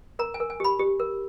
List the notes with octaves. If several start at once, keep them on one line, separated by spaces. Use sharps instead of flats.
A#4 A#5
G#5
A#4
G#5
G4 B5
G4
A#4